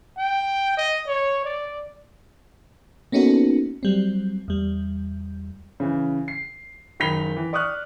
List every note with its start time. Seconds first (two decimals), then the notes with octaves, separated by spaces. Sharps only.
0.18 G5
0.77 D#5
1.07 C#5
1.45 D5
3.12 A#3 B3 C#4 D#4 F#4 A4
3.83 F#3 G3 C4
4.48 E2 G3
5.80 C#3 E3
6.28 C7
7.00 F#1 D#3 B5 B6 F7 G7
7.36 E3
7.53 D5 C#6 D#6 F6 F#6